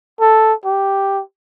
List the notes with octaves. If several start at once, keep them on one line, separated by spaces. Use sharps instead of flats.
A4
G4